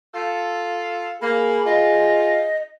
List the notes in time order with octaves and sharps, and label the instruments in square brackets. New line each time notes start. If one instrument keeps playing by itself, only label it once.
[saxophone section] F4 A4
[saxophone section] A#3 [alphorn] G#4 [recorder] B5
[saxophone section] F4 [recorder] D#5